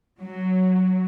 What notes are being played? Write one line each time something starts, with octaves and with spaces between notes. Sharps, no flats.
F#3